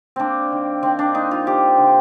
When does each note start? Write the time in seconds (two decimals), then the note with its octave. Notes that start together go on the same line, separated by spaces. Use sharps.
0.16 A#3 C4 D4
0.52 D#3
0.83 D#3 C4
0.99 D4
1.15 A#3 D#4
1.31 F4
1.47 F3 G4
1.78 D3